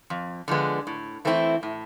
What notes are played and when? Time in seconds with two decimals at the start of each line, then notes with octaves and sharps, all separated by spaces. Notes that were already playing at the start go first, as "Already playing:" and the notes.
0.10 F2
0.48 D3 F3 G#3 B3
0.87 A2
1.25 E3 A3 C4 E4
1.63 A2